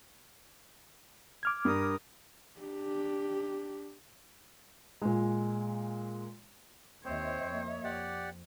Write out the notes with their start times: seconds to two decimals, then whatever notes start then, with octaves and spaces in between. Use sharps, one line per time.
1.43 D6 F6 G#6
1.65 G2 A#4 D#6
2.61 D4 G4
5.02 A#2 G#3
7.05 D#2 C4 C5 C#5 D#5 E5
7.44 F2 A#3
7.84 F2 G4 D5 F#5